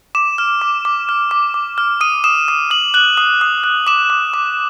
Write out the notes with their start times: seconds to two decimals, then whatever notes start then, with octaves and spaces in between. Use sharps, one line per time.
0.15 D6 E7
0.38 F6
0.61 D6
0.85 D6
1.09 F6
1.31 D6
1.54 D6
1.78 F6
2.01 D#6 D#7
2.24 D#6 E7
2.48 D#6
2.70 D#6 F#7
2.94 F#6 F#7
3.18 D#6
3.41 D#6
3.64 F#6
3.87 D6 E7
4.10 D6
4.34 D6